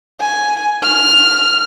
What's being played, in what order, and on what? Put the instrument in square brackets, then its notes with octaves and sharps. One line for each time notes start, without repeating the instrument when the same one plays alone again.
[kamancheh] G#5
F6